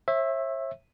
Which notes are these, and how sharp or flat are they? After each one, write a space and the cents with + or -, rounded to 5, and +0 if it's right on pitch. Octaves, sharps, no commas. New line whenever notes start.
C#5 -45 E5 +0